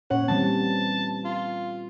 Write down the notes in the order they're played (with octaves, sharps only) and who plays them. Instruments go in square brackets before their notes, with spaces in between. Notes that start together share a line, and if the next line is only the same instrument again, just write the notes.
[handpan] A#2 C#4 C#5 [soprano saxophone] F#5
[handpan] E3 G3 C4 [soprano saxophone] A5
[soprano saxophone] F4